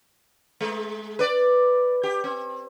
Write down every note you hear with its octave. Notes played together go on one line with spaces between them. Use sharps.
G#3
B4 D5
G4
C4